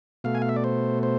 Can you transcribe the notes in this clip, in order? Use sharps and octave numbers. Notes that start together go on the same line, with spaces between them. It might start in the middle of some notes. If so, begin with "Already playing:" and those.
B2 A3 F5
G#5
F5
E5
D5
C5
C5